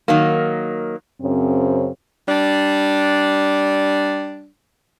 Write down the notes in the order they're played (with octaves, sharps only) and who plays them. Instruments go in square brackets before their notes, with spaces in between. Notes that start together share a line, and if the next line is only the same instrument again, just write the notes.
[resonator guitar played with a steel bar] D#3 F#3 A#3
[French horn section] F#2 C#3 C4
[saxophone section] G3 D4